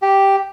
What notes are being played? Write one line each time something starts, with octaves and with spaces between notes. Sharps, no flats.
G4